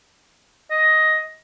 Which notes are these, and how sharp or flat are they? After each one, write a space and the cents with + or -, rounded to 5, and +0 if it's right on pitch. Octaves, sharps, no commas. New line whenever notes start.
D#5 +10